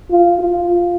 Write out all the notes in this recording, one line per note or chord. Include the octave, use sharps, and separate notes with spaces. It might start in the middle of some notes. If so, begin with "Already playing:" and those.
F4
F4